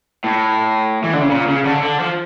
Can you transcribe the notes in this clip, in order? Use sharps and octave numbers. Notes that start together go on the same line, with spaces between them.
A2
E3
D3
C#3
A#2
C#3
D3
D3
F3